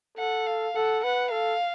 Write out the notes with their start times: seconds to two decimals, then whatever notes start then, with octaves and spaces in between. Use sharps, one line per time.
0.18 A4 F#5
0.46 F5
0.75 A4 F#5
1.04 B4 F#5
1.31 A4 F5